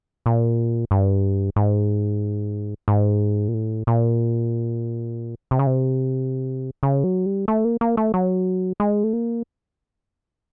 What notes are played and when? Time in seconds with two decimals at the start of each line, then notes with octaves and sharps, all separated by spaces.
0.26 A#2
0.91 G2
1.56 G#2
2.88 G#2
3.48 A#2
3.54 A2
3.87 A#2
5.51 C3
5.59 C#3
5.67 C3
6.83 C#3
7.04 F#3
7.26 G3
7.48 A3
7.65 A#3
7.81 A#3
7.97 A3
8.14 F#3
8.80 G#3
9.04 A3
9.13 A#3